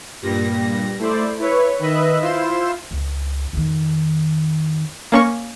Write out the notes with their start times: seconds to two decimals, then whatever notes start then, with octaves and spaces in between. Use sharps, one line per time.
0.22 G2 A#2 G3 A#6
0.98 A3 E4 C5 D5
1.39 E4 B4 C#5
1.79 D#3 B4 D#5 E5 F#6
2.21 E4 F4 C5 C6 E7
2.91 C#2
3.53 F2 D#3
5.12 A#3 C#4 C#6